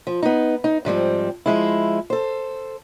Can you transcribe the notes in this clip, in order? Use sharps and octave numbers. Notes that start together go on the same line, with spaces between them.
F3
B3 D#4
D#4
G#2 F3 G3 C4
F3 G#3 E4
A4 C5